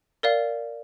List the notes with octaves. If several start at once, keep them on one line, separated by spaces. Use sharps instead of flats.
A#4 D5 F5